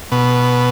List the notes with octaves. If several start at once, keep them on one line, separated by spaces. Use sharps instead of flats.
B2